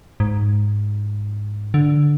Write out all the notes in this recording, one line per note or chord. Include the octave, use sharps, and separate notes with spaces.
G#2
D3